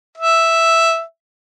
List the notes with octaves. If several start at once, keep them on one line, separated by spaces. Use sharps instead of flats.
E5